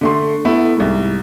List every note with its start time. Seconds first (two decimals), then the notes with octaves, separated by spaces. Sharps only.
0.01 D3 A3 C6
0.45 A3 B3 E4
0.77 C2 G#2